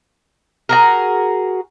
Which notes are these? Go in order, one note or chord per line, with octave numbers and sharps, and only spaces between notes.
F#4 G#4 A#4